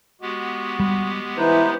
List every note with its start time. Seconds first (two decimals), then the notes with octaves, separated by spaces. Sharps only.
0.21 G#3 B3 F#4 G4
0.80 G3
1.37 E3 D#4 B4 C5